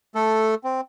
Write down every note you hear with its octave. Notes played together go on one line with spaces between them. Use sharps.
A3 A4
C4